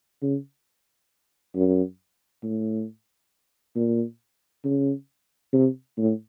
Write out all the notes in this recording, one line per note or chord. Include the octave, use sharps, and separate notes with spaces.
C#3
F#2
A2
A#2
C#3
C3
A2